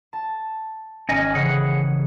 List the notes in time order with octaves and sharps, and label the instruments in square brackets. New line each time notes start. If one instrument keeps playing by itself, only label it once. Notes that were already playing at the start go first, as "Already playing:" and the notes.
[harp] A5
[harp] G#1 [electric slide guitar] C#4 D#5 G#5
[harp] C#3 E3 [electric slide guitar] G#4 F#5